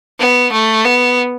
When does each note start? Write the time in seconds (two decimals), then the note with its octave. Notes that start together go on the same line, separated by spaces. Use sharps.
0.19 B3
0.52 A3
0.85 B3